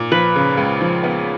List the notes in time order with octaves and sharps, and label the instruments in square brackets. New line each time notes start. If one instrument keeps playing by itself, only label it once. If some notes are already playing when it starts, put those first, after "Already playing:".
Already playing: [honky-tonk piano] A#2
[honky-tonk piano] F3 [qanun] B4
[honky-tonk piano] C#3
C#2
F3
B3